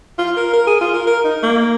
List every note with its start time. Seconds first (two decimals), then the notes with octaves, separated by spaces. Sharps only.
0.18 F4
0.36 A#4
0.53 A#4
0.67 G#4
0.81 F4
0.94 A#4
1.07 A#4
1.24 D#4
1.43 A#3